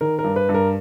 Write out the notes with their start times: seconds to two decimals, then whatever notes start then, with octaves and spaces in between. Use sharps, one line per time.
0.01 D#3 A#4
0.19 A#4
0.24 G2
0.36 B4
0.49 G2
0.54 A#4